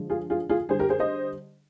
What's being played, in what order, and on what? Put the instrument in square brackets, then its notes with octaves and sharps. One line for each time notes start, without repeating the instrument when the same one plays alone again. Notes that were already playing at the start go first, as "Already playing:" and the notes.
Already playing: [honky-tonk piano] D3 F3 G#3
F4 G#4
F4 G#4
F4 G#4
D3 G3 G#4 C5
G4 A#4
G#4 C5
C5 D#5